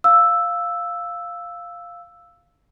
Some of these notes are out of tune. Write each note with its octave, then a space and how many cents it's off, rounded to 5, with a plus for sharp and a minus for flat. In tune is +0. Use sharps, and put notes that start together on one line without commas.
F5 +0 E6 +0